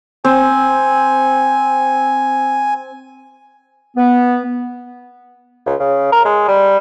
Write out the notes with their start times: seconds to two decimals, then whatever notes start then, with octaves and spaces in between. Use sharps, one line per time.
0.25 C4 G#5
3.97 B3
5.66 C#2
5.80 C#3
6.12 A#4
6.25 G#3
6.48 G3